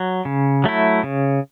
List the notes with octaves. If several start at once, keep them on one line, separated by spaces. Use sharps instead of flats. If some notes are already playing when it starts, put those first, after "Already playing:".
Already playing: F#3
C#3
F#3 A3 E4
C#3